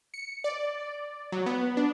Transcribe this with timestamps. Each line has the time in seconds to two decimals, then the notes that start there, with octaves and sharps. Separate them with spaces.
0.14 C#7
0.44 D5
1.32 F#3
1.46 B3
1.77 D4